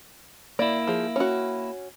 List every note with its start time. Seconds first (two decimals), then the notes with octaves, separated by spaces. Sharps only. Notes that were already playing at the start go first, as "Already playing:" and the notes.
0.59 A#3 E4 D5
0.87 F3 G#4
1.16 C#4 F#4